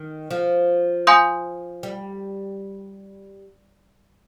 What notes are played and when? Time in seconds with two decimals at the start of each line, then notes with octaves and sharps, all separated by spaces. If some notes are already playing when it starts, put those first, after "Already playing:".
Already playing: D#3
0.31 F3
1.07 F5 G#5 C6 D#6 G6
1.83 G3